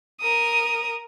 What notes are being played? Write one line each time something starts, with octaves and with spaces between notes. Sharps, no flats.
A#4 D#6